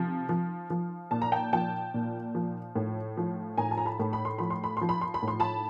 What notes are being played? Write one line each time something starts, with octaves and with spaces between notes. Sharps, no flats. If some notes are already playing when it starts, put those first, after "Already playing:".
Already playing: C3 F3
F3
F3
A#2 A5
A#5
G5 A5
F3 G5 A5
A#2
F3
A2
F3
A2 G#5 A#5
A5
A#5
A5 B5
A2
B5
C6
F3 B5
C6
B5
F3 C6
B5
C6
B5
A2
C6
A5 B5